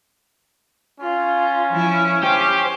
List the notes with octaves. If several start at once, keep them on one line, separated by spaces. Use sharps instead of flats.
C#4 F4
F3 E4
G4 C5